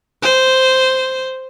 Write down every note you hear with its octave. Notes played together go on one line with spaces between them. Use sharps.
C5